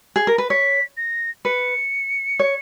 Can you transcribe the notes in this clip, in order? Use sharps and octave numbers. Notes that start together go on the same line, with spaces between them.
G#4
A#4
B4
C#5 B6
A#6
B4 C#7
C#5